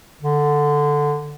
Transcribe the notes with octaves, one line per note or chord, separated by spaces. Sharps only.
D3